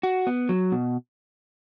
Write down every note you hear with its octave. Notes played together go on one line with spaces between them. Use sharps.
F#4
B3
F#3
B2